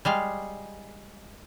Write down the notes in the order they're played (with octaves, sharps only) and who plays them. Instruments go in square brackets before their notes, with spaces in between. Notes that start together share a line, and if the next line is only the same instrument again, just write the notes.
[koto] G3 G#3 F5